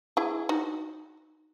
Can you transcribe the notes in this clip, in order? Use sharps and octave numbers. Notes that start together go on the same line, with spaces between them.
E4 G#4
D#4 F#4